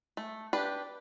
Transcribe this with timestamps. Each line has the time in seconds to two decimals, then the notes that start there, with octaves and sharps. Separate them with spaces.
0.17 A3
0.53 D4 G4 B4